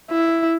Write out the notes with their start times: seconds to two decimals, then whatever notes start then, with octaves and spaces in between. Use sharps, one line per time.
0.11 E4